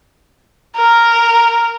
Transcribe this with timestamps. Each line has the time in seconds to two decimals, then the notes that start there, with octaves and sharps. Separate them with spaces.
0.76 A#4